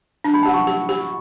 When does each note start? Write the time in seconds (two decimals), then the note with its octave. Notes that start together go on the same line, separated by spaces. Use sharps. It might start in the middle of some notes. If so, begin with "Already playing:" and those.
0.24 D4 A5
0.34 B5
0.43 F#5 A5
0.46 G4
0.53 A5 C#6
0.67 G4
0.89 G4